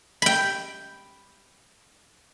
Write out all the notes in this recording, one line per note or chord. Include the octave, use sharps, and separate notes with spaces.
G5 B5